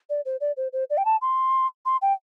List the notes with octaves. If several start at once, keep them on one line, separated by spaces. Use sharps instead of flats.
D5
C5
D5
C5
C5
D5
G5
A5
C6
C6
G5